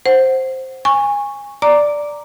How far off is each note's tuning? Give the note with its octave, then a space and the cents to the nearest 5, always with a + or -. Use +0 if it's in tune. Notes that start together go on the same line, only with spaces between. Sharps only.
C5 +5 F#5 +10
G#5 -20 C#6 +0
D5 +0 A#5 +0 D6 +0